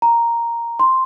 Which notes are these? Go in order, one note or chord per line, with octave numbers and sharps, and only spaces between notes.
A#5
C6